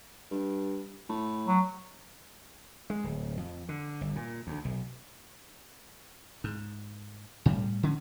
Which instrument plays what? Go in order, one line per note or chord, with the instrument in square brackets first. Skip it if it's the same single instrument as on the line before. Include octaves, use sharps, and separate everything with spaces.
[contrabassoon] G2
A2
[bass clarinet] F#3
[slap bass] G#3
D1
F2
D3
G1
A#2
D2
B1
G#2
A2 G3
D3 C#4